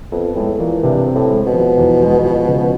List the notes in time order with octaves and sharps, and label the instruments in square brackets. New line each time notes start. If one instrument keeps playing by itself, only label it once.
[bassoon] F2 [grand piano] B3
[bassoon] A2 [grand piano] G#3
[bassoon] A#2 [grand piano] E3
[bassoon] G2 [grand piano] C3
[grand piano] C4
[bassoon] A2
[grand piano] G#3
[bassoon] B2
[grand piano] F3
E2
G#3
F3
C#3